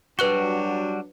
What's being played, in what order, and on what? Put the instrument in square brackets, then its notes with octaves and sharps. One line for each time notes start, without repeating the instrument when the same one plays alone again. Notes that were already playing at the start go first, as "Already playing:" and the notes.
[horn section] F#3 D4 [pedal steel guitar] G3 F#4 [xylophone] B4 F#6 G7